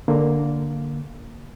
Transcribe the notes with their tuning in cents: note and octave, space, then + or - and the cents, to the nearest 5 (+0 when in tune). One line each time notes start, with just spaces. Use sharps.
D3 +0 A#3 +0